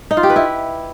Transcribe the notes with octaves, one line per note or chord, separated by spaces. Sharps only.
D#4
F4
G4
B4
E4